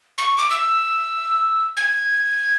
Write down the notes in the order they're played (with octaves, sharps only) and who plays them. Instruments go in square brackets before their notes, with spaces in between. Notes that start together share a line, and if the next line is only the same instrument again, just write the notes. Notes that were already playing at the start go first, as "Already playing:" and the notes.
[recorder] C#6
D6
E6
G#6